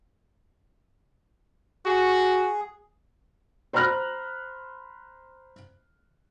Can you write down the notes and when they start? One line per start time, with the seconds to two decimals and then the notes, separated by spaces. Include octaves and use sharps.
1.85 F#4 G#4
3.73 C5 A#5 B5 F6 F#6 A#6